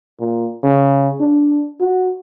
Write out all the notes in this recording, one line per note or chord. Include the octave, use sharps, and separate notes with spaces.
A#2
C#3
D4
F#4